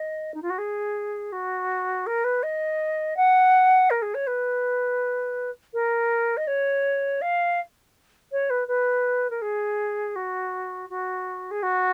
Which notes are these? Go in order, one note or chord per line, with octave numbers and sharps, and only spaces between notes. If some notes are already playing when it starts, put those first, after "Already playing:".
Already playing: D#5
D#4
F4
F#4
G#4
F#4
A#4
B4
D#5
F#5
A#4
G#4
C#5
B4
A#4
D#5
C#5
F5
C#5
B4
B4
A#4
G#4
F#4
F#4
G#4
F#4